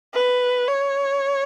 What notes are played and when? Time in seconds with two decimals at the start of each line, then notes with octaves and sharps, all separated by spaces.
0.14 B4
0.68 C#5